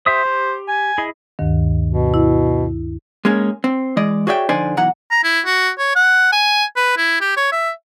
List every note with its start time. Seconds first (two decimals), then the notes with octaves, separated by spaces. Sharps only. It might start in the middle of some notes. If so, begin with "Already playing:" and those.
0.06 G4 C5 E5 D#6
0.25 G4
0.68 G#5
0.98 E4 G#4 D#5
1.39 D2 G2 D#3
1.87 B2
2.14 E4
3.25 G#3 A#3 C#4 G#4
3.64 C4
3.97 E3 G#3 D5 D#5
4.27 F#4 G#4 C#5 D5 E5 G5
4.49 D3 F3 D#4 C5 D5 G#5
4.77 B1 E3 F#5 A#5
5.11 A#5
5.24 E4
5.46 F#4
5.79 C#5
5.96 F#5
6.32 G#5
6.76 B4
6.97 E4
7.21 G4
7.37 C#5
7.52 E5